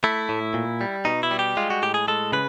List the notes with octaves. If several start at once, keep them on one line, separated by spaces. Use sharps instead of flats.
A3 E4
A2
A#2
G3
B2 D#4
E4
G3
G4
G#3 F4
F#4
A2 G4
G#4
G#3 A4
C#3 B4